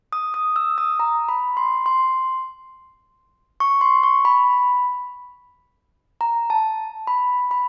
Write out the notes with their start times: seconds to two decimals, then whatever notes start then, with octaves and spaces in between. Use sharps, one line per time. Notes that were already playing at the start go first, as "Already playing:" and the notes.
0.13 D#6
0.34 D#6
0.56 E6
0.78 D#6
1.00 A#5
1.29 B5
1.57 C6
1.86 C6
3.60 C#6
3.81 C6
4.03 C#6
4.25 B5
6.21 A#5
6.50 A5
7.07 B5
7.51 B5